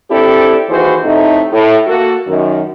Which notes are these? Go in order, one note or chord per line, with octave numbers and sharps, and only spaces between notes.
C4 D4 E4 G4 A4 D5
D#2 E3 E4 F#4 G#4 C5
A2 C3 A3 D#4
A2
A#3 F#4 A4
F#2 D#3